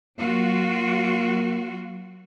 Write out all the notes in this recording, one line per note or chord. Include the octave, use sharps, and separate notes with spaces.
F#3 A#3 F4 F#4